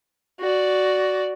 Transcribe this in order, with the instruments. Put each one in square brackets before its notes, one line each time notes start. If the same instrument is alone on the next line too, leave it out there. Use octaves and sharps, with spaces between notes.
[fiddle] F#4 D5